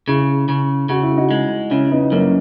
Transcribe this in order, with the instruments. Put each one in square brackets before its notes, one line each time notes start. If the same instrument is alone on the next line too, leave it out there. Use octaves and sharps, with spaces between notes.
[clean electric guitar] C#3 [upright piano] E4 G#4
[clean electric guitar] C#3
[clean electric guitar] C#3 [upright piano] F#4
[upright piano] E4
D#4 F#4
[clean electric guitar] G#3
[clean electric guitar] C#3 [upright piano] C#4 E4
[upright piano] B3 D#4
[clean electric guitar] F#2 [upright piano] A#3 C#4